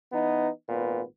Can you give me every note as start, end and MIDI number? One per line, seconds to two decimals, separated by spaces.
0.13 0.48 52
0.13 0.48 59
0.13 0.48 63
0.69 1.02 32
0.69 1.02 46
0.69 1.02 59
0.69 1.02 71